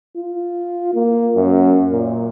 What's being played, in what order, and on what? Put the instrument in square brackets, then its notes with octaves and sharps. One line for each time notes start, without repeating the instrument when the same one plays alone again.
[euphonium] F4
A#3
F#2
A#2